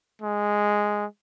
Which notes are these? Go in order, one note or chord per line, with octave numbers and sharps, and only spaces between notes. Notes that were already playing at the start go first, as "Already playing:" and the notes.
G#3